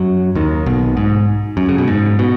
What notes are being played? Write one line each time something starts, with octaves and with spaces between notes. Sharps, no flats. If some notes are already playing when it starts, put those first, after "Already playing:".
Already playing: F#2 F#3
D#2 D#3
B1 B2
G#2
F#2
C#3
B2
G#2
B2